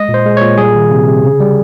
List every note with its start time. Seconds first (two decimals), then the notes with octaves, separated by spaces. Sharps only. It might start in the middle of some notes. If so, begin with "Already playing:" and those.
Already playing: G#3 D#5
0.09 A#2
0.14 C5
0.26 G#3
0.37 A#2 C#5
0.58 G3 G#4
0.75 D#3
0.91 C3
1.07 C3
1.24 C#3
1.40 G3